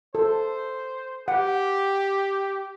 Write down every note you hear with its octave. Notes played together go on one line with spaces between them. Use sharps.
A4 C5
G4 F#5